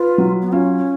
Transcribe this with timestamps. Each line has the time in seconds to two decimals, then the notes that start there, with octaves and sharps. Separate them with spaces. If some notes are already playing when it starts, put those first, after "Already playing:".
Already playing: F4 B4
0.18 F#3
0.42 B3
0.52 C#4 F4